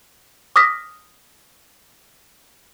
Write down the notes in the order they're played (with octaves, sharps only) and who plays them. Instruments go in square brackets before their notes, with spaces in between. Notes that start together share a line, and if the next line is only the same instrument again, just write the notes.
[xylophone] D6 D#6 F6 A#6 B6